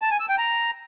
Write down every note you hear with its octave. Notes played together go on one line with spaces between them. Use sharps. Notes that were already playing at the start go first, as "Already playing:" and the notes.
A5
G#5
E6
G5
A#5